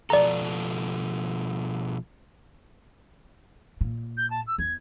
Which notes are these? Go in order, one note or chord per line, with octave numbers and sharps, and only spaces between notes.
B2 F3 A4 D5 A#5
A#2
G6
A5
E6
E2 G#6